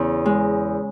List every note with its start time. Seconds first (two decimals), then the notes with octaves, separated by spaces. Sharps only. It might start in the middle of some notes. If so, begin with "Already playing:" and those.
Already playing: E2 C#3
0.26 G#3